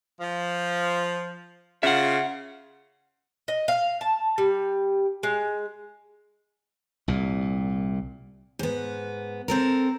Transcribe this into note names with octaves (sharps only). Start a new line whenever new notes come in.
F3
C#3 F4 E5 F#5
D#5
F5
A5
G3
G#3
C2 A#2
G#2 B3
C4 A4 A#4